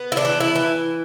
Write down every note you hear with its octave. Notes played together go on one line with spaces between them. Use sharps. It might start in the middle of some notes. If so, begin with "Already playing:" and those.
Already playing: B3
E4
D4
E3
E4
E3